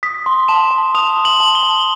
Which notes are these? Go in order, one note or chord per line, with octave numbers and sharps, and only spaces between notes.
D#6 B6
C6
A5 E7
A5
D#6 F7
C6
F#7
A5
G7
A5